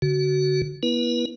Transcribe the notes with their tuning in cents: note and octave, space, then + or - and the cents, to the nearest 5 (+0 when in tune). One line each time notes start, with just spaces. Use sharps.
D3 -35 F#4 +15
B3 -45 E4 +0 B4 -25